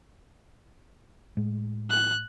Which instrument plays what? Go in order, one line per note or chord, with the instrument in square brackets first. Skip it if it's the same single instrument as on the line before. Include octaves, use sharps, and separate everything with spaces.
[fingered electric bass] A2 G#3
[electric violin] F#6